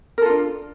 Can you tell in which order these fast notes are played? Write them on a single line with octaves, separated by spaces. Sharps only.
A#4 A4 F4 D4